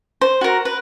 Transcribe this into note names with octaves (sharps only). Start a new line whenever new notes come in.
C5
F#4 A#4
B4